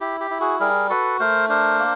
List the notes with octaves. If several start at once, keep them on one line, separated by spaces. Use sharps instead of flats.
E4 G4
G4
E4
F#4 G#4
G3 G#4 A#4
F#4 A4 B4
A3 A#4 C5
D4 A#4 C5
A#3